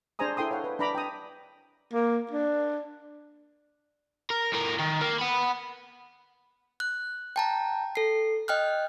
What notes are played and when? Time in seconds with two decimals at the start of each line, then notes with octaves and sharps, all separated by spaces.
0.19 D4 G#4 C5 G#5 A#5 D#6
0.37 E4 A4 G5 C6 D#6
0.51 C#5 F5 F#5
0.64 B4
0.79 D4 B4 A#5 B5 D6
0.95 G5 A#5 D#6
1.93 A#3
2.31 D4
4.30 A#4
4.53 A2 A#4
4.79 D#3
5.02 A#3
5.20 F#5 B5
6.80 F#6
7.36 G5 A5 A#5
7.95 A4 C7
8.48 D#5 G5 F6 F#6